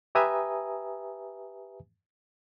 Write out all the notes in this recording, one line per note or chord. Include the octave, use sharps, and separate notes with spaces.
G4 B4 E5 G#5 A#5 D#6